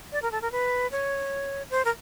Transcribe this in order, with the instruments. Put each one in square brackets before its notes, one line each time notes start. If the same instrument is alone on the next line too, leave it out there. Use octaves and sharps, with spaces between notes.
[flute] D5
A#4
A4
A#4
B4
C#5
C5
A#4